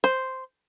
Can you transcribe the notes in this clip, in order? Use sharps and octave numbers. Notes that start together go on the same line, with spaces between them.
C5